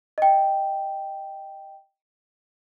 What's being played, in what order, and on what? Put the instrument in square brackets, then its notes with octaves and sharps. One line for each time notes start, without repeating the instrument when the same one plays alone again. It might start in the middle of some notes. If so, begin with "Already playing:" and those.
[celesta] D#5 G5